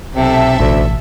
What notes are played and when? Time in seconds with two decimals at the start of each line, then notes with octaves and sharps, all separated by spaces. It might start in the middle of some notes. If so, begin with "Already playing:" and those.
0.14 B1 C3 A4 E5
0.59 A1 D2